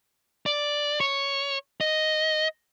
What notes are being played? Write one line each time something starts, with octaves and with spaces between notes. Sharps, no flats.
D5
C#5
D#5